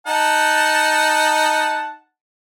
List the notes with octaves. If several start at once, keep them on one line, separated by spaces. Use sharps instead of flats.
D#4 F#5 A5